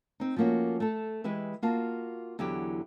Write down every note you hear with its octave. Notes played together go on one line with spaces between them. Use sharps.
C4 D#4
F3 A3 A#3 C#4 F#4
A3 A4
E3 G#3 G4 B4 E5
A#3 F4 F#4 A5
E2 D3 F#3 E4 G4